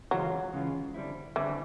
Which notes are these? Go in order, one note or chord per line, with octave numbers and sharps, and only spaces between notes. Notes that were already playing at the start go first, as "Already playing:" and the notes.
C#3 E3 F#3 G#3 C#4 F4
C#3 E3 G#3 C#4 F4
D3 G3 C4 E4
D3 E3 G3 C4 E4